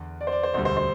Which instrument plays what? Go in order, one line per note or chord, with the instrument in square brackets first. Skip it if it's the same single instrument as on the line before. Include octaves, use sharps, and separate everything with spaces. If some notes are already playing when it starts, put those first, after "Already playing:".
Already playing: [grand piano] E2 D3
[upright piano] D5
C5
D5
C5
[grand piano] E1 D2 D3 G3 [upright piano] C5
[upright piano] C5
C5